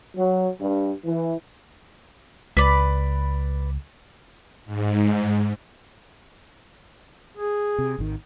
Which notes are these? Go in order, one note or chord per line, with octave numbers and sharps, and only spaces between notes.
F#3
G2
E3
C#2 B4 D5
G#2
G#4
C3
G#1 D#3